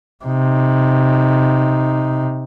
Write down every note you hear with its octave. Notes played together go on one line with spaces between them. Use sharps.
C3 D#4